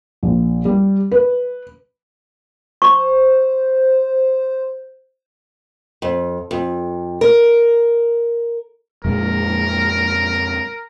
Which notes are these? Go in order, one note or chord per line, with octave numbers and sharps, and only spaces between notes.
A#1
G3
B4
C5 C#6
F2
F2
A#4
F2 A#2 G#3 A#4